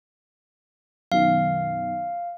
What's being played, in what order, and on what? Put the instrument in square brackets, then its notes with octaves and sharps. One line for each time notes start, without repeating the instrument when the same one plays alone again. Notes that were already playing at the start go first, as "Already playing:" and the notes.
[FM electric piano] F#2 B2 D#3 [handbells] F5